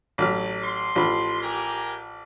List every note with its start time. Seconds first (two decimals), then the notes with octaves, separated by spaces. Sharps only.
0.18 A1 F#3 F6
0.63 C6
0.95 A1 F3 B5
1.43 G4 G#4 A#4